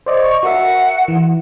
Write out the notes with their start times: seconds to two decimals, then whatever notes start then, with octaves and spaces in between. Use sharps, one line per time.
0.06 C5 D5 D#5
0.23 C#6
0.43 F#4 A#4 E5 F#5
1.08 E3